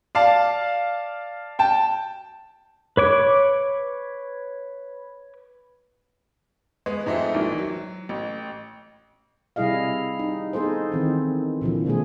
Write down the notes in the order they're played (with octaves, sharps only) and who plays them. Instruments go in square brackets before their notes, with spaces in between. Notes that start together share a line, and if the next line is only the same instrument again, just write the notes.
[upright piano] D5 F5 A5
G5 A5
[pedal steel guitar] B4 C#5 D6
[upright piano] G#3 B3
G#2 F3 G#3 A3 C4
A#1 G#2 D#3 E3
F#3
A1
[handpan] C3 G3 E4 G#4 D#5 F5
D#4
B3 D#4 G#4 A4 C5
D#3 E3 C4
A#2 D3 E3 F3
B2 D#3 G#3 A#3 G#4